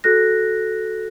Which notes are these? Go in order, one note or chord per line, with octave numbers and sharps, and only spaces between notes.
F#4 A4 F#6 A#6